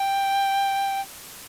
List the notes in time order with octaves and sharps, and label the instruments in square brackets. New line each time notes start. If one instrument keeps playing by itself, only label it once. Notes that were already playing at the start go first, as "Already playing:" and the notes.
Already playing: [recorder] G5